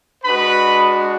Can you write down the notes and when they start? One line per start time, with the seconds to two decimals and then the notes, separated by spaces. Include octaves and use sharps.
0.24 G#3 D4 F#4 B4 B5